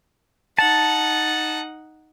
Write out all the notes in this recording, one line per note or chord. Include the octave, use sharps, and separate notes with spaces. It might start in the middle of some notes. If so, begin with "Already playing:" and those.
D#4 F#5 A5